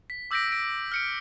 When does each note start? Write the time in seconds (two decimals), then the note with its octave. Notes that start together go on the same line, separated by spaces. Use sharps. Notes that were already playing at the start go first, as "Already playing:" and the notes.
0.10 B6
0.31 D6 E6 G6 A#6 B6 D7
0.52 D7
0.92 F6 C#7 D7